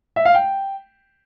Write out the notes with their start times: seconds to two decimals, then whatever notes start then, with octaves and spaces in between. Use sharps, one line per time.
0.16 E5
0.25 F5
0.35 G5